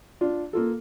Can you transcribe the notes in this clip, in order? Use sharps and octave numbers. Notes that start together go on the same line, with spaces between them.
D4 F4
A#3 F4 A4